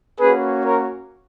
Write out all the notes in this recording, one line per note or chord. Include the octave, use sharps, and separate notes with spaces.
A#3 C#4 F#4 G#4 B4
A#4 C#5